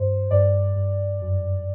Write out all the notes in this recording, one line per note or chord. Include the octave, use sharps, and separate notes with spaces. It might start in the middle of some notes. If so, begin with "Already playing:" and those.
Already playing: G2 C5
G2 D5
G2
F#2